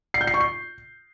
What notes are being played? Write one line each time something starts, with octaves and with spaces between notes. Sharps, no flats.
C7
G6
C7
C#6
C7